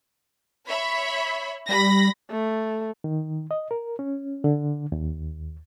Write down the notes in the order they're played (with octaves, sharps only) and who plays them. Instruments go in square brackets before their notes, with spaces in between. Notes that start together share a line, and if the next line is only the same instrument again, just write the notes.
[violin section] C#5 E5 B5
[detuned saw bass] G3 [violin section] B5 A#6
[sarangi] A3
[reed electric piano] D#3
D#5
A#4
C#4
D3
D#2